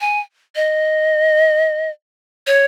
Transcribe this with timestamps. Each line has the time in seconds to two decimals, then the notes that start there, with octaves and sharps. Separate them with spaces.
0.01 G#5
0.56 D#5
2.47 C#5